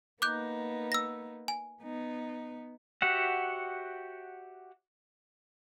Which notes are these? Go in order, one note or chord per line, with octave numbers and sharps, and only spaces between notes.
A#3 B3 D#4 D6 F#6 G6
E6 A#6
G#5
B3 D#4
F#4 G4 C#5 E5 F#5